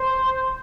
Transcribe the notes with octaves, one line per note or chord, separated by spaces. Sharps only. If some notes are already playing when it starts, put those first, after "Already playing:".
Already playing: C5